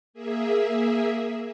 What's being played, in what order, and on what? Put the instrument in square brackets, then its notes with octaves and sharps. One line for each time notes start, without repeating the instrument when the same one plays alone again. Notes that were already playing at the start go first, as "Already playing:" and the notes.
[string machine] A#3 G#4 E5